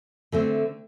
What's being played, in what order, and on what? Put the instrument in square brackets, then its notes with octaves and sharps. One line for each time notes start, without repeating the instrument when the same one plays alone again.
[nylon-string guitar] D3 A3 C4